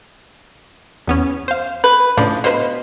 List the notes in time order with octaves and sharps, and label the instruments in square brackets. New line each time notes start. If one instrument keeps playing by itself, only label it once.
[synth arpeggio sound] E2 B3 C#4
C5 F5
[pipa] B4
[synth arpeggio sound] A2 C#3 D4 [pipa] F3
[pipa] B2 [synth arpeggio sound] B4 C5 F5